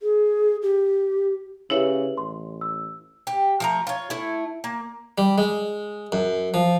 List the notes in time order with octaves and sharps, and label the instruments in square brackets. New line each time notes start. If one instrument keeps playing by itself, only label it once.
[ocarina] G#4
G4
[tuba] C#3 [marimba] E4 C#5 E5 [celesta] G4 B4 F#7
[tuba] A1 [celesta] C6
[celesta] E6
[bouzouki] G4
F3 A3 A#5
F4 C#5
A3 E4
A#3
[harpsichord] G3
G#3
F#2
F3